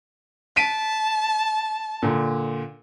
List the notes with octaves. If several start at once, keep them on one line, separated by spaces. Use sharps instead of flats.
A5 B6 D7 D#7
A#2 D3